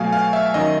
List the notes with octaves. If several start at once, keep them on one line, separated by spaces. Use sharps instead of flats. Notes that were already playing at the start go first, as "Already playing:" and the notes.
Already playing: B2 F#3 A3 F5 G#5
F5
E5
F#2 D#3 F#3 D#5